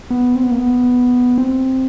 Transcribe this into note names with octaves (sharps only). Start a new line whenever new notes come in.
B3
C4
B3
A#3
B3
C4